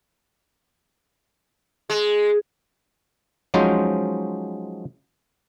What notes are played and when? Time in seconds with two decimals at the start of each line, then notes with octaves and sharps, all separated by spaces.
1.90 G#3
3.54 F3 F#3 G#3 C#4 D#4 C5